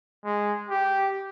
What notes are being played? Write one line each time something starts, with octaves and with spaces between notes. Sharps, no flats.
G#3
G4